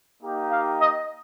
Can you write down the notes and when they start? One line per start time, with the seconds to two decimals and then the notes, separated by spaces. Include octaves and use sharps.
0.22 A#3 D#4 G4
0.50 F5
0.79 D#5